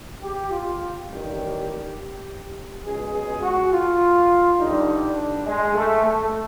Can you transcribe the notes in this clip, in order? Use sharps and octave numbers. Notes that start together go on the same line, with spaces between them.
G4
F4
G4
A1 G2 D#3 G3
C#2 B2 G#3 G#4
G#4
F#4
F4
G2 D3 G3 D#4
D4
G#3
A3
A3